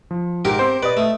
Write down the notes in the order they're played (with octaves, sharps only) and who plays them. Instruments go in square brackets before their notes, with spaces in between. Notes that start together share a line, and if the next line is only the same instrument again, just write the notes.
[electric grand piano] F3
[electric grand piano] G#2 [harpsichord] G4 A#4
[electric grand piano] C4 C5
[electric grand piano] B4 D#5 D#6 [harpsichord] D5
[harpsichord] A3